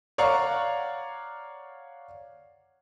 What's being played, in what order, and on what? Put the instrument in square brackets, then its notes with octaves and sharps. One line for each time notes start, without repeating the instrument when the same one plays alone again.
[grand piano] C#5 D5 F5 F#5 A#5 C#6